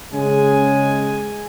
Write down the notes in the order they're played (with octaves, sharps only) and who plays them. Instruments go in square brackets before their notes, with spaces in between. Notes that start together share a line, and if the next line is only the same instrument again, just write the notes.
[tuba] C#3 [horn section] G#3 G#5